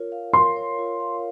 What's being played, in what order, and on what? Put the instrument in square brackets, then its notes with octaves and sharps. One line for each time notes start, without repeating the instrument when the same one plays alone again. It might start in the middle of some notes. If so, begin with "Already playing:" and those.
Already playing: [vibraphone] F4 A#4 C#5
F5
[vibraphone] A#4 [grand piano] C6
[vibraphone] C#5
F4
F5